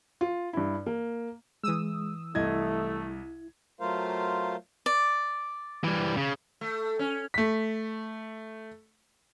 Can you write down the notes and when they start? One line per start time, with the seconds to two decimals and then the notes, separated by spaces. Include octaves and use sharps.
0.21 F4
0.53 G2 E4
0.86 A#3
1.64 E3 G#3 D#6 E6
2.35 C2 A3 E4 D#5 G#6
3.80 F#3 A3 F4 A#4 C5 F5
4.86 D5
5.84 E3 G3
6.17 C#3
6.61 A3
6.99 C#4
7.34 A3 B6